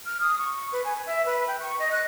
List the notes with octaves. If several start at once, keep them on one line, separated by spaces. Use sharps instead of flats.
F6
D#6
C#6
B4
G#5
E5
B4
G5
C#6
D#5
F#6